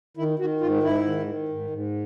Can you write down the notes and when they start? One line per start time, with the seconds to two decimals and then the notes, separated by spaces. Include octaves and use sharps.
0.17 D#3 E4
0.39 D#3 F#4
0.61 G#2 F4
0.83 G#2 E4
1.05 D#3
1.26 D#3
1.48 G#2
1.70 G#2